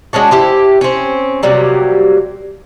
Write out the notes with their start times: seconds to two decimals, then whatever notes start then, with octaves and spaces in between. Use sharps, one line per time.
0.13 G#3 C#4 D4 F#4
0.31 E4 G4 C5
0.81 C4 C#4
1.43 C3 F#3 G3 A#3